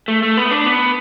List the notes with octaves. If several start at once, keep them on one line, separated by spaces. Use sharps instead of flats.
A3
A3
B3
D4
B3